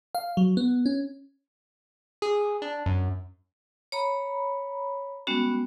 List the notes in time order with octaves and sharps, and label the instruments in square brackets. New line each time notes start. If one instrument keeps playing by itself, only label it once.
[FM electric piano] F5
F#3
B3
C#4
[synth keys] G#4
D4
F#2
[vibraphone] C#5 A#5 B5
G3 G#3 B3 C#4 F#4